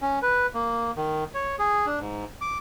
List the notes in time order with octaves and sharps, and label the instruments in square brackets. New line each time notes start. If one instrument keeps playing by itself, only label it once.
[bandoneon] C#4
B4
A#3
D#3
C#5
G#4
D4
G#2
D6